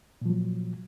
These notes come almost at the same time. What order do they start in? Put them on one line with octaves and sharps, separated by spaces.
A#2 F3 F#3